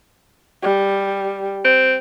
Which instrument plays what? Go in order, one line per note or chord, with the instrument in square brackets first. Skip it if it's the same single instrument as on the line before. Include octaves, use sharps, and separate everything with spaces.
[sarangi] G3
[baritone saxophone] C4